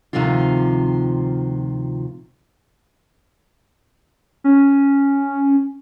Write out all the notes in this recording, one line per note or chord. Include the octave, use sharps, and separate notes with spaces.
D2 C3 D#3 F3 C4 F4
C#4